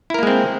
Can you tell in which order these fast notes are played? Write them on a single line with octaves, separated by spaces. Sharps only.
E4 A#4 A#3 G#3 C4